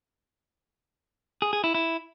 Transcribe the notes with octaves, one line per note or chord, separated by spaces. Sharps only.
G#4
G#4
E4
E4